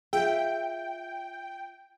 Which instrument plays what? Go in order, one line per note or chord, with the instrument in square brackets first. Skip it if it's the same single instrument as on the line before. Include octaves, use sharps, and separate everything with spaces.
[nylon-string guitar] F4 E5 [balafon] G#4 [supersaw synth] G5